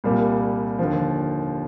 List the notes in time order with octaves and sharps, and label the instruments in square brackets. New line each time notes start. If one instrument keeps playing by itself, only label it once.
[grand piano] C2 A#2 G3 A#3
D#2 D3 F3